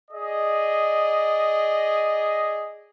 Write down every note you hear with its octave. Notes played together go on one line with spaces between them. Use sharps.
G#4 D5 D#5